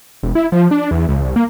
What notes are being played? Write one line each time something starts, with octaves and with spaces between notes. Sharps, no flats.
E1
E4
F3
D4
E2
C#2
C2
A#3